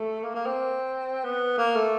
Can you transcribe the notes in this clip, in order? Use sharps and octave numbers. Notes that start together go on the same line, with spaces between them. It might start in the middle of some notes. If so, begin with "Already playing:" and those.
Already playing: A3
A#3
A#3
C4
B3
A#3
A3